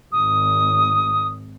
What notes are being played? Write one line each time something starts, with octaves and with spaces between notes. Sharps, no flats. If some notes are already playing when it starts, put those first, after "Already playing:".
G#1 D#6